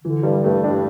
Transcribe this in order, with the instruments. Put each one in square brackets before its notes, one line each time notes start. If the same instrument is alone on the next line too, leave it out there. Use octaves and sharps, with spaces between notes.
[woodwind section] D3 [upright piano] E3
[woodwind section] G2 [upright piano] G3
[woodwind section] G2 [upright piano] A3
[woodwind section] G2 [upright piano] D4